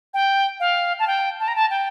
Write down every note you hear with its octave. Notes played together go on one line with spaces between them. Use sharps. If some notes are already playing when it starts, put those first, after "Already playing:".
G5
F5
A5
G5
A5
A#5
A5
G5